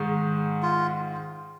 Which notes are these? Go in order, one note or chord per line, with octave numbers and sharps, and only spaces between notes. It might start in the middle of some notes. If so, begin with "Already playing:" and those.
Already playing: G#2 D#3 G#3
F4